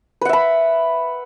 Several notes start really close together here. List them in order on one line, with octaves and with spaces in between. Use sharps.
B4 F#5 E5 B5